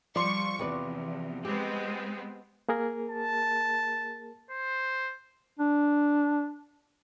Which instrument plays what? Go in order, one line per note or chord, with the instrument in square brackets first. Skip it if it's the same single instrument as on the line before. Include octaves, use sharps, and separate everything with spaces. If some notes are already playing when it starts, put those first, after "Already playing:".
[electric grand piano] F3 C6 [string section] G3 C#6 [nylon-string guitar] D5
[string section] E2 [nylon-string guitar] C3 B4 D5
[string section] G#3 B3 C4 [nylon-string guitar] G4
[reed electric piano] A#3 G#4 A#4
[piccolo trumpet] A5
C5
[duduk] D4